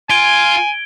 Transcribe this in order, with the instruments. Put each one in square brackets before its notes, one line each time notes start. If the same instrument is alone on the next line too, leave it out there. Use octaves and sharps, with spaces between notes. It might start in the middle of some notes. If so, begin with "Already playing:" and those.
[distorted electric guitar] F4 [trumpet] G#5 [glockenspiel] G#6 D7 G7